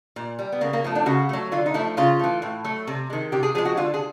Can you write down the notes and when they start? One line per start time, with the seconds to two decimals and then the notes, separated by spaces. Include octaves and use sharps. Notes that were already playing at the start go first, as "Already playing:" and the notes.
0.16 A#2
0.39 G3
0.52 B3
0.61 C#3 A#3
0.73 A#3
0.84 F3 A3 B3
0.95 D4
1.06 C#3 F#4
1.29 F#3 A3
1.52 D3 F4
1.66 D#4
1.74 F3 A3 E4
1.97 C#3 F4
2.19 E3 A3
2.42 A2
2.64 F#3 A3
2.87 C3
3.10 D#3 G#3
3.32 C3 G4
3.43 G#4
3.55 F3 G#3 G#4
3.65 F#4
3.77 D3 F4
3.94 G#4